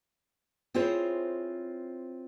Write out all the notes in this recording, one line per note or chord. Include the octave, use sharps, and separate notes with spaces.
C4 E4 F4 G#4 C5 C#5